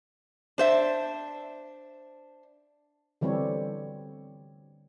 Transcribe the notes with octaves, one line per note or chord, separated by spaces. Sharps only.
D4 C5 E5
D3 E3 G3 C4 A4 C#5